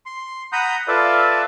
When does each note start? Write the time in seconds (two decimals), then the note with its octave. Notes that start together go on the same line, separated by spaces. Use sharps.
0.06 C6
0.52 F#5 A#5 B5 D#6 G6
0.88 F4 A4 B4 D5 E5 F5